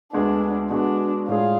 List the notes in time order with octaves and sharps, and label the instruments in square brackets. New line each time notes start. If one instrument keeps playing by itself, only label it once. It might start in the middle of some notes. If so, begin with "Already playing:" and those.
[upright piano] D2 D3 G#3 B3 [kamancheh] D4
[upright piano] B2 G#3 B3 F#4 [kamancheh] D4
[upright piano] A2 G#3 D4 G#4 [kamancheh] F4